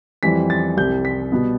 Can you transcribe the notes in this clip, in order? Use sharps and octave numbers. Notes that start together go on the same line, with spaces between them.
F2 E3 G3 C4 B6
A6
C2 C3 G3 G6
B6
B2 G3 B3